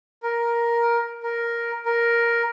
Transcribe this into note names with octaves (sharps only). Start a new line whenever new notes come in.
A#4
A#4
A#4